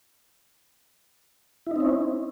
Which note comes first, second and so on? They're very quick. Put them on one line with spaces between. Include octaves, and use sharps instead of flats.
E4 D#4 C4 C#4